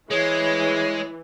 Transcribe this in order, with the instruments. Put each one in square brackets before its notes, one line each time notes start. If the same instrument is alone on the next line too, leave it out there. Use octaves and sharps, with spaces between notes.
[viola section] E3 [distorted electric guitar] G#3 [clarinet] G#4 [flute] C#5